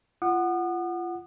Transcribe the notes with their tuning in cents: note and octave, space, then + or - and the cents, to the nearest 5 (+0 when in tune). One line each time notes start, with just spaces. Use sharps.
F4 -25 F#5 +0 D#6 -40